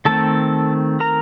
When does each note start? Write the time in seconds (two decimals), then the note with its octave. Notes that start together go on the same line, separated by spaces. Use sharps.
0.05 D#3 A3 C4 A4 A5
1.00 A#4 A#5